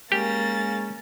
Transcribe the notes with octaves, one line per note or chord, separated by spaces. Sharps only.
G#3 A#3 C#4 G4 A6